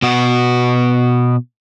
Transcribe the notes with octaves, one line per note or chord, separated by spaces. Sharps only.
B2 F#4